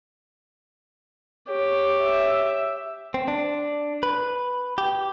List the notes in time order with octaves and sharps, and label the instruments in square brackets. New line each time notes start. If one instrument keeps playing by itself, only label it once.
[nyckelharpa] G4 [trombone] C#5
[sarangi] E5
[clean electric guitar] C4
D4
B4
G4